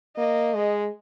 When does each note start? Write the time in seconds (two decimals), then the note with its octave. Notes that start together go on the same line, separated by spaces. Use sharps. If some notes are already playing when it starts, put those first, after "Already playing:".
0.17 A#3 D#5
0.54 G#3